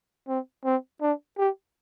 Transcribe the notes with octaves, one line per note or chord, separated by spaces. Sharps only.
C4
C4
D4
G4